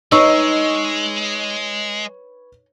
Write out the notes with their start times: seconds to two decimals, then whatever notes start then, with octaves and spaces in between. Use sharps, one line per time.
0.12 G#3 D#4 B4 C#5 D#5 C#6 E6